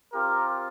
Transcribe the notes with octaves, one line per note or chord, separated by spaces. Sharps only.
C4 F4 G4 A#4